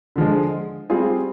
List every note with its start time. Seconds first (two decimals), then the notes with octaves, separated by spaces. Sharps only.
0.16 D3 F3 G#3
0.90 G3 C4 F4 G#4